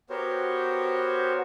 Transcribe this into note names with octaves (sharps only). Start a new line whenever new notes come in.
B3 F#4 G4 A#4 C5 C#5